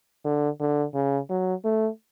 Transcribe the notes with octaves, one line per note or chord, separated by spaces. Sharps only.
D3
D3
C#3
F#3
A3